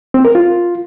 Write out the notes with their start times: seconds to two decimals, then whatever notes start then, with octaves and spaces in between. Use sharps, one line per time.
0.14 C4
0.25 A#4
0.35 F4